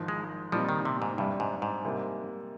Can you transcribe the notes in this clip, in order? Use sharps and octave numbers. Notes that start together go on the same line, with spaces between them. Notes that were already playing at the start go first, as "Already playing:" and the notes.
Already playing: G#1 G#2 F3
G#3
A#2 F3 G3 C4 D#4
D#3
C3
G#2
G2 C3 G3 D4
G#2
G#2
C3 G3 A#3